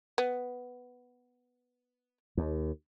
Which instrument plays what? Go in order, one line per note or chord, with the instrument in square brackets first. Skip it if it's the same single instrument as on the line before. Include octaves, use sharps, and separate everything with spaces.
[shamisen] B3
[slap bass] D#2